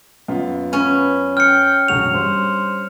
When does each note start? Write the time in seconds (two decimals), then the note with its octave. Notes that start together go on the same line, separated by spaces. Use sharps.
0.28 F#2 B3 F4
0.73 C#4 B4
1.37 G5 F6 C#7
1.88 E1 F#3 F#4 G#4 F7
2.14 G2 C5